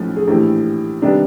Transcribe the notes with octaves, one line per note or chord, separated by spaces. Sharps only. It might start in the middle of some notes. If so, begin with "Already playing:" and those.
Already playing: B1 A2 F3 A3 C#4
G#4
A#1 A2 E3 A3 G4
C3 D#3 G3 B3 D4